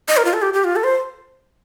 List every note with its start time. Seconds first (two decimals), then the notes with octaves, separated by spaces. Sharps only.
0.09 D#5
0.17 A#4
0.25 F4
0.33 A4
0.42 G4
0.53 G4
0.64 F4
0.76 A4
0.84 C5